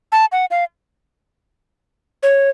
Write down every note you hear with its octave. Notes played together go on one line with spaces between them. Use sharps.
A5
F#5
F5
C#5